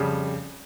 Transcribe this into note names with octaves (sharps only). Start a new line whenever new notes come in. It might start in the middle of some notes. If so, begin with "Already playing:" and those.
Already playing: F2 C#3 G3